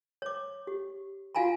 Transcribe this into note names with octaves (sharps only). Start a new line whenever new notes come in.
C#5 D6
G4
F4 F#4 F5 G#5 A#5 B5